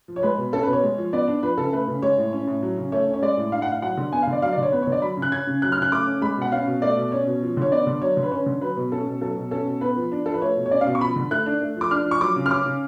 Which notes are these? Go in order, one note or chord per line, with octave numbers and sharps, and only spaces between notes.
F3
C#5
G#3 B4
B2
C#4 A4
B2 B4
C#5
G#3
F3
B3 D5
D4
F3 B4
C#3 A4
A3 B4
C#3
G#3 C#5
A2
C#4
A2
F#3
C#3
A3 C#5
C#4
C#5
G#3 D5
A2
D4 F5
F#5
A2 F5
F#3 F#5
D3
B3 G#5
D3 F5
D5
F#3 F5
D5
D3 C#5
B3 B4
D3 C#5
D5
F#3 B5
C#3
F#6
C#4 G#6
C#3
F#3 F#6
F6
C#3 F#6
A3 D6
C#4
G#3 B5
B2 F#5
C#4 F5
B2
A3 D5
B2
C#4 C#5
B2
F3
D3 C#5
B3 D5
D3
F#3 C#5
D3
B4
C#4 C#5
D3
F#3 B4
B2
C#4 A4
B2
F#3 A4
B2
C#4 A4
B2
B3 B4
F3
D4
F3 A4
B4
A3 C#5
B2
C#5
C#4 D5
F5
B2
C#6
F3 B5
D3
A3 F#6
D4
A3
F3 D6
D4 F6
F3
C#6
F#3 D6
C#3
F6
C#4 D6
C#3